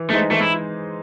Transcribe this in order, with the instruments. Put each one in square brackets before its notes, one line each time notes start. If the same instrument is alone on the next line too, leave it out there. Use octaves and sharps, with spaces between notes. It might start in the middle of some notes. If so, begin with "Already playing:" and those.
Already playing: [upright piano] E3
[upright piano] G#3 D#4 G#4 C5 [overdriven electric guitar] A3
[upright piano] E3 [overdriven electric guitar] A3
[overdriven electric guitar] E4